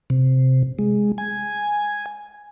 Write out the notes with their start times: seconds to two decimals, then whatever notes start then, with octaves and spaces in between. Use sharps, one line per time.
0.10 C3
0.79 G#3
1.18 G#5